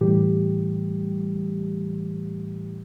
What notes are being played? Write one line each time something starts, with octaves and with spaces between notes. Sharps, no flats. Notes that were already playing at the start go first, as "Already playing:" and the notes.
A2 E3 G3 G4